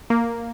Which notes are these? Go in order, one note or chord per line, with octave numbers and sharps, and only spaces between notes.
A#3